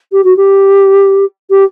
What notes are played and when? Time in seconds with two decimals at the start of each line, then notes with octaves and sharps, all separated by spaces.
0.12 G4
0.24 F#4
0.36 G4
1.50 G4